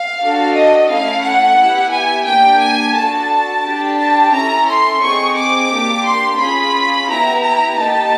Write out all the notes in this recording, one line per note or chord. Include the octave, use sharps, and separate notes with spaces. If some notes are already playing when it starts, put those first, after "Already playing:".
Already playing: F5
D4 F#4 A4
D#5
A3 C#4 E4 F5
F#5
B3 E4 G4
G#5
A#3 D4 G4 G5
G#5
D4 F#4 A4 A5
D4 G4
A5
C#4 E4 A4 A#5
C6
C4 D#4 G#4 C#6
D6
A#3 D4 G4
C6
C#4 F4 G#4 B5
B3 E4 G4 A#5
A#5
A#3 D#4 G4 A5